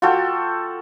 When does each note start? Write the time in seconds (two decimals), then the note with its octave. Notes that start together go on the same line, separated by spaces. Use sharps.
0.02 F4 F#4 A4 G5